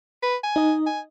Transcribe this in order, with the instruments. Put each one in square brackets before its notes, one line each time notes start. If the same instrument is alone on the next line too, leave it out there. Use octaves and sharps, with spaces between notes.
[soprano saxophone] B4
G#5
[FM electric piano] D#4 D#5
[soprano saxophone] G#5